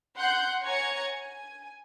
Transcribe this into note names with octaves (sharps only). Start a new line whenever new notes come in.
F#5 C6 F#6 G6
C#5 F#5 G#5 A#5 G#6 C#7
G#5